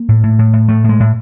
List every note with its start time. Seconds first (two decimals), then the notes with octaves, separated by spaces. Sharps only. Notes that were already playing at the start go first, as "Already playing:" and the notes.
Already playing: A#3
0.08 A2
0.23 A2
0.39 A2
0.53 A2
0.69 A2 A3
0.84 A2
0.89 G#3
1.00 A2